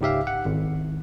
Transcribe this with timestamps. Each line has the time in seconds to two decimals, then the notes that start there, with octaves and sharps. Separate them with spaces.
0.01 C#2 G#2 G4 E5 F5
0.27 F#5
0.45 G#1